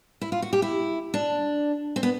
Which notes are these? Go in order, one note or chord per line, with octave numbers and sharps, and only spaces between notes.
E4
F4
F#4
G4
E4
D4
C4
B3